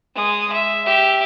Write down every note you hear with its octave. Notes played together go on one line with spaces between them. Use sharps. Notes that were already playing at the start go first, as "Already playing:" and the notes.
G#3 D#6
E5
G4 E5